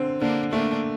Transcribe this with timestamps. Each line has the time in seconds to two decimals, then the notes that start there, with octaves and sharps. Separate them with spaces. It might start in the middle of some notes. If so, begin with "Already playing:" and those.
Already playing: D3 C4
0.21 D3 A#3 D4
0.52 A3 A#3 D4